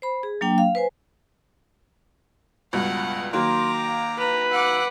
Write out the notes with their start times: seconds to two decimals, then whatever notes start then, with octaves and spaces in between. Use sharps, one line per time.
0.02 C5 B5
0.23 G#4
0.41 F#3 A#3 D4 G5
0.58 F5
0.75 B4 C5 G#5
2.73 C#2 G2 B2 F#5
3.33 D#3 F#3 A#3 A#5 C6 D6
3.84 F5
4.19 B4 A#5
4.51 F#5 D6 E6